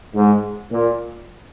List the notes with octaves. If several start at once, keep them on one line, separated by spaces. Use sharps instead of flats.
G#2
A#2